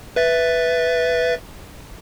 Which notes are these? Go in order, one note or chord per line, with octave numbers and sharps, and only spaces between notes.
B4 E5 A6